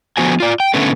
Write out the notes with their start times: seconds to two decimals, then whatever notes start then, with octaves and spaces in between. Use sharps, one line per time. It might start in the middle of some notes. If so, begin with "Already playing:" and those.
0.17 D3 F3 B3 F#4 C5 G#5
0.40 F4 D5
0.60 G5
0.74 D3 A3 B3 C#4 A4